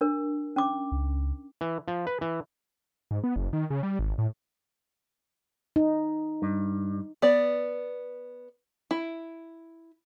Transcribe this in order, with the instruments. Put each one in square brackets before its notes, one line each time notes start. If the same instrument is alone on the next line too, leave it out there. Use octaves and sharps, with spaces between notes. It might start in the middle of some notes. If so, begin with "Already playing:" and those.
[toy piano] D4 A#4
C#4 D6
[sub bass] C#2
[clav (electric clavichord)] E3
F3
B4
E3
[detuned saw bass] G#2
B3
F#1
D#3
C#3
G3
G#1
A2
[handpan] D#4
[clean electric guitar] G2
[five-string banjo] B3 D5
E4